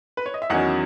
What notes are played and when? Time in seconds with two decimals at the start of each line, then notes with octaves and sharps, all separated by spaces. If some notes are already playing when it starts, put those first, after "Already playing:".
0.17 B4
0.26 C#5
0.34 D#5
0.42 E5
0.50 E2 D#3 F#3 C#4 D#5 F#5